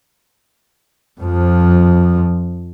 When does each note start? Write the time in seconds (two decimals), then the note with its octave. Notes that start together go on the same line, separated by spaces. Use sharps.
1.20 F2 F3